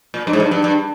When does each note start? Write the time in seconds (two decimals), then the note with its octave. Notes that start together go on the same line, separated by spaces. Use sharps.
0.14 A#2
0.27 G2
0.33 G#2
0.40 G2
0.51 G2
0.64 G2